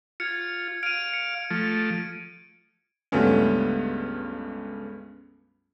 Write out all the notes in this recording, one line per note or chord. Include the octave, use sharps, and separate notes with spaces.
F4 G#6 C#7
F5 D7 D#7
C#7
F3 A3
C#2 G2 A3 B3 C#4